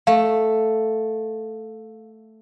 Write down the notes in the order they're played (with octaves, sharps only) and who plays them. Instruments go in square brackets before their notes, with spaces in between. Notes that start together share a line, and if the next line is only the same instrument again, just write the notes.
[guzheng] A3 [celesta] F5